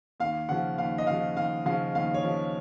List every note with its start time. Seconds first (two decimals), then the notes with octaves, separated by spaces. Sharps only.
0.20 D#2 F5
0.49 C#3 F3 F#5
0.78 D#2 F5
0.98 D#5
1.07 C#3 F5
1.11 F3
1.36 D#2 F5
1.66 C#3 F3 F5
1.95 D#2 F5
2.14 C#5
2.24 C#3 F3